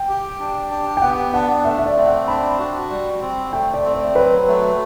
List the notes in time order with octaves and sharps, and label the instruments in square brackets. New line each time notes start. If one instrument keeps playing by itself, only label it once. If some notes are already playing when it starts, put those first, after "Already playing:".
Already playing: [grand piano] G5
[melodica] G4
D4
G4
[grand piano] G5
[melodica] B3 [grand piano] F#5
[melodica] D4 [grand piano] F#5
[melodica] A3 [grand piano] E5
[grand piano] E5
D5
[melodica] C4
[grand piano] F#5
[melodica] D4 [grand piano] B5
[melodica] F#4
G3
C4
[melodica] A3 [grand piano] G5
[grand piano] D5
[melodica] C4
[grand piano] D5
[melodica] F#3 [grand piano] B4
[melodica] A3